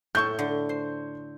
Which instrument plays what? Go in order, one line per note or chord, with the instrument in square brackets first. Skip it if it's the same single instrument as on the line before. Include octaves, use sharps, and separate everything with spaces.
[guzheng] A2 A5 [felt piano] C#6 G6
[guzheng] D3
C5